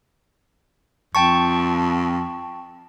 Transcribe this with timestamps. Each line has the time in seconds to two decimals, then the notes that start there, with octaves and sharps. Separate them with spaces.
1.15 F2 G5 A5 C#6